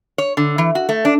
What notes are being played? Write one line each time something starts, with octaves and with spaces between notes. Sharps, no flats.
C#5
D3
E3
F#4
A3
D4